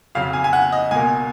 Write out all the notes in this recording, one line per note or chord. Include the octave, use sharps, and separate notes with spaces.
F2 C#3 F#3 F5
G#5
G#5
F#5
D#5
C#2 B2 A#3 G#5